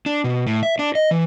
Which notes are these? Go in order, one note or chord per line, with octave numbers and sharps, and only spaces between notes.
D4
B2
A2
E5
D4
D#5
E3